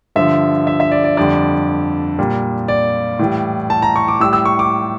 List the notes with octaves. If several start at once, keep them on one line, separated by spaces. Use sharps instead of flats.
G2 D3 F3 E5
E5
E5
D5
D5
F2 D3 G3 D5
A#2 G3
D5
A2 E3 G3
A5
A#5
C#6
D6
A2 G3 E6
E6
C#6
D6